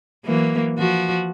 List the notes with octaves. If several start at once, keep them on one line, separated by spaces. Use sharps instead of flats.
E3 F#3 A#3
F3 F#4